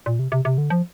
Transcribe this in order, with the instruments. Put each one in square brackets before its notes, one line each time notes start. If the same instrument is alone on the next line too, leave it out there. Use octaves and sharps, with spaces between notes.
[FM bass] A#2
C3
C3
C3
D3
F3